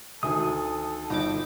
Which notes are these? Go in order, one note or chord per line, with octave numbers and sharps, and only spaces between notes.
D2 D#3 A4 G#5 D#6
G1 D#4 G5 D6